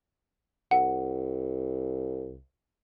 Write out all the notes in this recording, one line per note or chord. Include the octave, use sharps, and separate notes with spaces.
C2 F#5